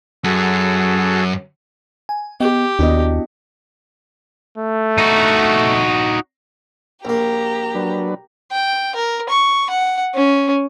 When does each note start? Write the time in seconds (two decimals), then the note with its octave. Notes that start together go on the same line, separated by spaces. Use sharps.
0.24 F#2 F#4 G#4 A4
2.09 G#5
2.40 B3 G4 D#5 G5
2.79 D#2 B3 D4 E4 F#4 D#5
4.58 A3
4.98 D#4 F#4
7.05 A#1 A#3 G4 A#5
7.75 F#3 D4 B4
8.52 G5
8.95 A#4
9.29 C#6
9.70 F#5
10.14 C#4